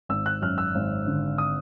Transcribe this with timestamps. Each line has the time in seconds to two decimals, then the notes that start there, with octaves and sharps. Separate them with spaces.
0.09 G#1 E6
0.26 F#6
0.42 F#2 F6
0.58 E6
0.75 G#1
1.07 D3
1.38 D#6